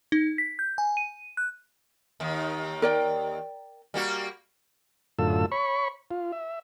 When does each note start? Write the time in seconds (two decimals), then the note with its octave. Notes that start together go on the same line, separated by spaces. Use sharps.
0.12 D#4
0.38 B6
0.59 G6
0.78 G#5
0.97 D#7
1.37 F#6
2.20 D#2 D#3
2.82 A#4 D5 G5
3.94 G3 A#3 F#4
5.19 F#2 A2 D3 F4 A4 E6
5.52 C#5 B5 C#6
6.11 F4
6.32 E5